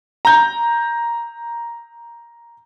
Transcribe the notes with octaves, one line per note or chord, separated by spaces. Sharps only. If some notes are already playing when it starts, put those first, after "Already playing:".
A#5 G6